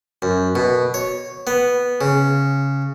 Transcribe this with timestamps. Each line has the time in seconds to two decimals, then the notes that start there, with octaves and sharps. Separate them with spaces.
0.22 F#2
0.55 B2
0.94 C#5
1.47 B3
2.01 C#3